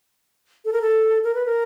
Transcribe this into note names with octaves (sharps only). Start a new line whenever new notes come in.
A4
A#4
A4
A#4
B4
A#4